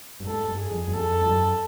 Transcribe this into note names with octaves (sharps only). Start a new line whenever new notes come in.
G2
G#2 A4
G2
G#4
F2
F#2
F2 A4
F2
F#2